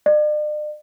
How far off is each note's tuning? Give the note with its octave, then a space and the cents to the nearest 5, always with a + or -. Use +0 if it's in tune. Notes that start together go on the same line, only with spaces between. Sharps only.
D5 +45